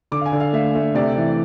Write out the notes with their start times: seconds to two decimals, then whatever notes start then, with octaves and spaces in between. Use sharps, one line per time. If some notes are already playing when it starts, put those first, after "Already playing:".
0.12 D3 D6
0.21 F5
0.26 G#5
0.33 D3
0.40 F5
0.53 A3 E5
0.75 A3
0.95 C3 D5
1.17 E3